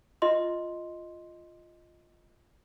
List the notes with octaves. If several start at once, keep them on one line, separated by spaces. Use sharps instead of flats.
F4 D#5 C6